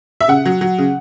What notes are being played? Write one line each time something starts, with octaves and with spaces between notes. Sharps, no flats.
E5
C#3 F#5
F#3
F#3
C#3